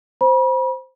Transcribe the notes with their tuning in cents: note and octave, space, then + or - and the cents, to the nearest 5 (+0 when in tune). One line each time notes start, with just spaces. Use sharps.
C5 +0 B5 -40